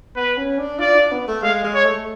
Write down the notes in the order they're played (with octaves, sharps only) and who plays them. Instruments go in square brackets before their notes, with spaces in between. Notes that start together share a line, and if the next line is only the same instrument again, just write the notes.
[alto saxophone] B3 [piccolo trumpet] B4
[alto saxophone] C#4
D4
[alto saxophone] F4 [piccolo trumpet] D5
[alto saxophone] D4
B3
A3
[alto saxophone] G#3 [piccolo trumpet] F5
[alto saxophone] G#3
[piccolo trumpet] C#5
[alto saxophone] A3